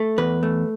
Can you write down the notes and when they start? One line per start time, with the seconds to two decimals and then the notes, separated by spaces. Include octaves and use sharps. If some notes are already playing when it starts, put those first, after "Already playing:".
Already playing: A3
0.18 E2 B4
0.43 A3